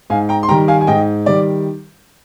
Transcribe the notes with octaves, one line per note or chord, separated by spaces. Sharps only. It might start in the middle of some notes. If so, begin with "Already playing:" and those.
G#2 F5 G#5
G5 A#5
C6
D#3 G3 G5 A#5
F5 G#5
G#5
G#2 D#5 G5
D#3 G3 D5